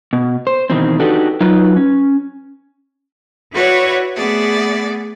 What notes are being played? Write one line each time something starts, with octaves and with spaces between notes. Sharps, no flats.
B2
C5
B2 D#3 E3 C4
D4 D#4 F#4 G4 A4 B4
F#3 D#4 F4 B4
C#4
E4 F#4 B4 C#5 D5
A3 B3 G#4 D5 E5